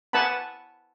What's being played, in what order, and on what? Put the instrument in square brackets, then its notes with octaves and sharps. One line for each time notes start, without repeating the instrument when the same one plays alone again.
[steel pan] B4 F#5 G#5 A5 B5